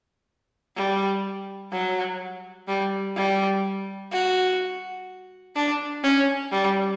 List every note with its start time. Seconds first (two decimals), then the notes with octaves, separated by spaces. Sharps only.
0.77 G3
1.72 F#3
2.68 G3
3.16 G3
4.12 F#4
5.55 D4
6.04 C#4
6.52 G3